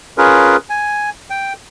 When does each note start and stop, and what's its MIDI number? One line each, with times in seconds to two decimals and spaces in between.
0.18 0.57 61
0.18 0.57 65
0.18 0.57 68
0.18 0.57 70
0.18 0.57 71
0.70 1.10 80
1.30 1.53 79